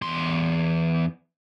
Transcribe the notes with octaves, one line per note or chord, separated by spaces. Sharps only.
E2 C6